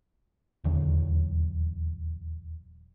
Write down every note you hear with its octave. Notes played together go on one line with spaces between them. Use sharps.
D#1 E2 D3 F#3